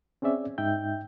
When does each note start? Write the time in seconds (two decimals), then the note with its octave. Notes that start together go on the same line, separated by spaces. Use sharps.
0.22 C4 C#4 G#4 D5 E5
0.58 G#2 D#4 E5 G5 G6